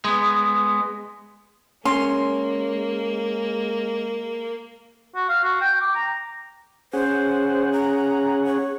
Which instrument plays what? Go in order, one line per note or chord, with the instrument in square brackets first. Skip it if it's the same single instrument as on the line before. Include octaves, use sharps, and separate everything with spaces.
[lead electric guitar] G#3 B3
[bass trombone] G#3 [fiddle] A#3 [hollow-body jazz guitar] C#4 [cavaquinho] C6
[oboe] F#4
F5
F#4
G5
D6
A#5
[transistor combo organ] C#4 G#4 F#5 [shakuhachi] C5
[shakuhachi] A#5
C#5